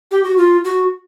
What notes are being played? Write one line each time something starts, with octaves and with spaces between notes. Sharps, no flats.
G4
F#4
F4
F#4